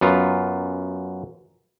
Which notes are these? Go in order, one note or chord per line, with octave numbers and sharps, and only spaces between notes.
F#2 B3 F4